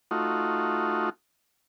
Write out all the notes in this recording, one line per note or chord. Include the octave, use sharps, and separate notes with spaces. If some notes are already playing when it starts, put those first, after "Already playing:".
A3 D#4 F4 F#4